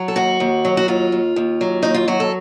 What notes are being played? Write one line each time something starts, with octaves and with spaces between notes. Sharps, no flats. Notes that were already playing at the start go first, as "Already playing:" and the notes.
Already playing: F#3
A4
D#2 F#4
D#2
F#3
F#4
D#2 F4
D#2
D#2
F#3
D#2 D#4
F4
F#3 F#4
A4